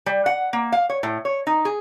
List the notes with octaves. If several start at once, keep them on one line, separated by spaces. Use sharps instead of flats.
G3
F#5
A#3
F5
C#5
A2
C#5
D#4
G#4